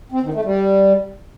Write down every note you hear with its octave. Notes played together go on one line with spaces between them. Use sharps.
C4
D#3
A3
G3